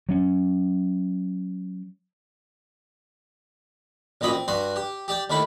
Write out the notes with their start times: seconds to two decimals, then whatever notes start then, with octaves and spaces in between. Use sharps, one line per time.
0.09 F#3 C#4
4.21 A1 A#2 F#3 D#5 B5
4.32 C4
4.48 G2 F#4 C6
4.76 G4
5.08 G4 D5 G5
5.30 D#2 A3 E4 B5